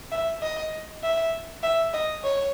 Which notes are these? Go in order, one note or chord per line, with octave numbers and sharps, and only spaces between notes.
E5
D#5
E5
E5
D#5
C#5